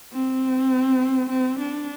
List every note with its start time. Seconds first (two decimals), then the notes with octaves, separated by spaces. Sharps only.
0.13 C4
1.30 C4
1.59 D4